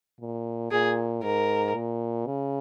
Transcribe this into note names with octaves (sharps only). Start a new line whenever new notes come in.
A#2
A#2 G#4
G#2 A#4
A#2
C#3